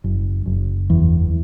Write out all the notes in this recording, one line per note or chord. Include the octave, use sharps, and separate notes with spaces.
F#1
F#1
E2